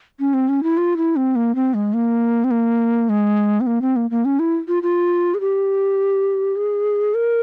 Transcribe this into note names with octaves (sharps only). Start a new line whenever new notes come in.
C#4
C4
C#4
E4
F4
E4
C4
A#3
C4
G#3
A#3
C4
A#3
G#3
C4
A#3
C4
A#3
A#3
C#4
E4
F4
F4
G#4
G4
G#4
A#4